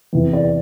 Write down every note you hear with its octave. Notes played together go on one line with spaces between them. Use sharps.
E2 C3 E3
D5